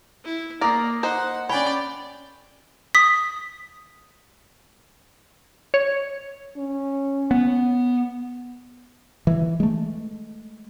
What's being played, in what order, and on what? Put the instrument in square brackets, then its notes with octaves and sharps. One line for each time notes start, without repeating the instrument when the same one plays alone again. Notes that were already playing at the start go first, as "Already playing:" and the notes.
[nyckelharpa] E4
[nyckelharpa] A#3 [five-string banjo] A#4 D5 [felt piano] A#5 D#6 A#6
[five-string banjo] D#4 C5 [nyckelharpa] F#5
[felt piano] C#4 G#5 B5 [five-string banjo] C#5 [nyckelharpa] D5 G5
[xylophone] D#6 B6
[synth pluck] C#5
[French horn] C#4
[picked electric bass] B3
[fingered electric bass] E3
G#3 A3